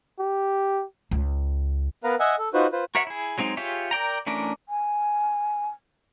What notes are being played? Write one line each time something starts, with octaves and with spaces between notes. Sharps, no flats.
G4
C#2
B3 A#4 B4 F5 A#5
D#5 E5 F#5 G#5
A4
D#4 F4 F#4 B4 C5
F4 B4 C5
F#4 A#4 C#5 E5 F#5
E4 G#4
F#3 G#3 C4 D#4
F4 G4 G#4 C#5 E5
A#4 D5 G5 A#5
E3 A3 C#4 D4 A#4
G#5